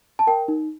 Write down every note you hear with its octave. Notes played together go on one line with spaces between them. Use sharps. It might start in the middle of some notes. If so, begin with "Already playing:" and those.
A5
A#4 G5
D#4